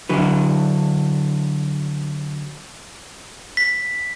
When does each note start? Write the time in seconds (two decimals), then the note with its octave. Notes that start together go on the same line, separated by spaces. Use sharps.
0.09 D3 F#3 B4
3.57 B6